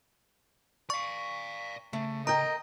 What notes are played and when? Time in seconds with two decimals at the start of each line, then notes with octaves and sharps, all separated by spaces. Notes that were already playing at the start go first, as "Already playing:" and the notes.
0.90 D5 F5 C#6
1.93 C#3 A3
2.27 A#4 D#5 G5 A#5